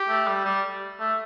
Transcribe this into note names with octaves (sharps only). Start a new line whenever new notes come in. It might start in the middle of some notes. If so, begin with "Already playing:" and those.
Already playing: G4
A3
G3
G3
A3